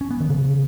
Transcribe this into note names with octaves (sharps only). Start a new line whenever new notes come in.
C#4
B3
D#3
C#3